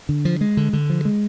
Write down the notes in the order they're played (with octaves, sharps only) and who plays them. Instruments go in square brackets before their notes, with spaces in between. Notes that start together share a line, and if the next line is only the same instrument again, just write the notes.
[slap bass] D3
F3
G#3
D3
D3
F3
G#3